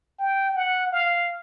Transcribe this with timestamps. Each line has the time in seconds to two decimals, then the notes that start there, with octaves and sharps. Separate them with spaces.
0.19 G5
0.56 F#5
0.92 F5